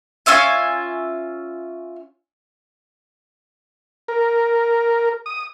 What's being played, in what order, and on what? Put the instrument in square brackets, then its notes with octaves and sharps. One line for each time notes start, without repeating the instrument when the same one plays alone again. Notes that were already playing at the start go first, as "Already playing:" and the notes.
[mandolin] C#4 F4 E5 G#5
[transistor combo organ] A#4
D#6